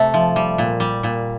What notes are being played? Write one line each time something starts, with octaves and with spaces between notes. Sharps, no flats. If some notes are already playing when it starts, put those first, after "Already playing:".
Already playing: C3 A3
F3
G3
A#2
G3
A#2